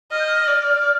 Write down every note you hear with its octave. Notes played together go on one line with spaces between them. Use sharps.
D#5 F6
G6
F6
D5